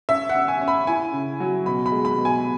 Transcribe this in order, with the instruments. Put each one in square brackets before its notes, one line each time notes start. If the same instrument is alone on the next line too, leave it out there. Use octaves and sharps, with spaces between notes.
[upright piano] C#4 E5
F#5
C#4
G#5
C#4
B5
E4 G#5
C#3
F#3
B2 B5
B5
G#3
B5
B2
G#5